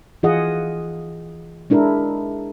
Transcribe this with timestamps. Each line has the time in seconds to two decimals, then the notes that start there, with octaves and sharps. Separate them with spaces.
0.23 E3 F4 G#4 D#5 F#5
1.70 G#3 D4 E4 A#4